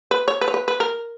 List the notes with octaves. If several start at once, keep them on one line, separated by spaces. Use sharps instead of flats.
B4
C#5
B4
C#5
B4
B4
A#4